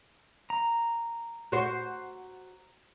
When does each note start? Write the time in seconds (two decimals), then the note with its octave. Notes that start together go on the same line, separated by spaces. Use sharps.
0.50 A#5
1.52 F#4 C5